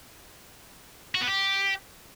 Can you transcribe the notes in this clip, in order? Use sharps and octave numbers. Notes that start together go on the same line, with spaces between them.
F#4
B3
G4